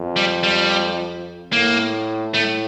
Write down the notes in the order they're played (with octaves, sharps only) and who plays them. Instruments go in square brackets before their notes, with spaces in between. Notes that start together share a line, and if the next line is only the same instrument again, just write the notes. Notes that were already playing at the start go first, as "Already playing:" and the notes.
Already playing: [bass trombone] F2
[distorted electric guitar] G3
G3
[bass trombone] A2 [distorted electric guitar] A#3
[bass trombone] A2 [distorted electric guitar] A3